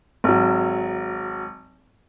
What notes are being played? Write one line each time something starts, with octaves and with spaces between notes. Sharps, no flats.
G#1 F#3